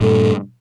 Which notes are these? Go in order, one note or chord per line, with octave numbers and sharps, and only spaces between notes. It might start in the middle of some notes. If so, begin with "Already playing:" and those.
G2 A#2 A4